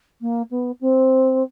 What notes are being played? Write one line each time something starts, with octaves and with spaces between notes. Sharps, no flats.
A#3
B3
C4